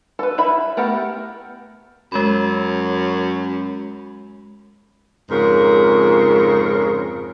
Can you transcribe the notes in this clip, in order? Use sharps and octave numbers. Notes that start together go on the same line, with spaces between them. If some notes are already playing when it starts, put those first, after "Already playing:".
A4 B4
E4 E5 B5
A3 B3 G4 A#4 F#5
F#2 G#3 B5
F2 G#2 C#3 A#4